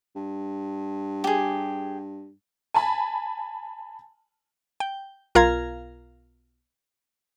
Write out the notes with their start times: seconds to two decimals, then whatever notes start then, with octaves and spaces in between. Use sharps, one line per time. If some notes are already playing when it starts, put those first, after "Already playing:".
0.16 G2
1.24 G4 G#4
2.74 G#5 A5 B5
4.80 G5
5.35 B1 F4 A#4 F5 A#5 G#6